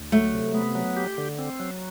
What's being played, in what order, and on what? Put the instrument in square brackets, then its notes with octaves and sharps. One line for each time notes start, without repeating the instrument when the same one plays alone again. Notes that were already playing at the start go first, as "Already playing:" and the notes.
Already playing: [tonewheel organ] D2
[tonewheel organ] F#3 [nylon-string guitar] A3
[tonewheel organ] C3
B3
F#3
G4
D3
C4
F#3